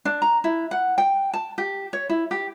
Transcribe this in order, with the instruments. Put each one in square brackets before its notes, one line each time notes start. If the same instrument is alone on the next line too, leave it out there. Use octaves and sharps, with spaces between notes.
[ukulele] D4
A#5
E4
F#5
G5
A5
G4
C#5
E4
G4